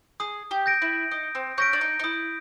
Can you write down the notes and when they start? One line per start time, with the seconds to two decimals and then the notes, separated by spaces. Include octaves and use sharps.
0.20 G#4 D#6
0.51 G4
0.66 G6 A#6 D7
0.82 E4
1.11 D#4 D#6
1.35 C4
1.58 C#4 G6 A#6 D7
1.73 D4
1.81 D#4
1.99 D#4
2.04 E4 D#6